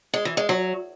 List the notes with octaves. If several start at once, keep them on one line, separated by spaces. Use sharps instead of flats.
G#3
E3
G#3
F#3